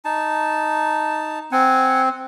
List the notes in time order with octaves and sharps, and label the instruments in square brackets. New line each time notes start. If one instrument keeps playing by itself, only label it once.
[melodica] D#4 A5
[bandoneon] C4 [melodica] F#5 G#5